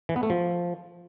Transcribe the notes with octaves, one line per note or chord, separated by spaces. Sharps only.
E3
B3
A3
F3